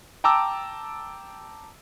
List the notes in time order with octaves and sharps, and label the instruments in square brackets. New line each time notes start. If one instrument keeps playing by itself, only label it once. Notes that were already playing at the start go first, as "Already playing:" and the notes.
[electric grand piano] G5 A5 A#5 D6 E6